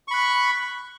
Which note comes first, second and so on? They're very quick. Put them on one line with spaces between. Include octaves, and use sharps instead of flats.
C#6 B5 F#6